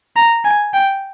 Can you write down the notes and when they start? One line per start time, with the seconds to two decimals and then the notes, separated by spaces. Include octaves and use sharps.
0.16 A#5
0.45 G#5
0.74 G5